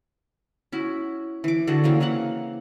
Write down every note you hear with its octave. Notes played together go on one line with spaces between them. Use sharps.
C#4 E4 F#4
E3 D6
D3 F#4 G#4 A4
C#3 E3 A#3 C4
E3 A#3 F5 F#5